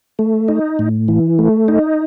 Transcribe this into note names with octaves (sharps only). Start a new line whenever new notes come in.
A3
D#4
A2
E3
A3
D#4